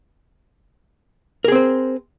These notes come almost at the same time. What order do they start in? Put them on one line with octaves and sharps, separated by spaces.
A#4 G#4 C4 C5